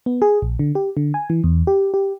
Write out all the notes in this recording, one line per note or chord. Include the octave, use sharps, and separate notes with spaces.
B3
G#4
A#1
D3
G4
D3
G#5
E3
E2
G4
G4